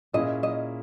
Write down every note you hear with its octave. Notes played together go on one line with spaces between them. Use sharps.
A#2 A#3 C#4 E4 G#4 D#5
D#5